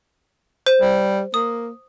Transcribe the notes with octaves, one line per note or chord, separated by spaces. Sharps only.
C5
G3
A#3 D#6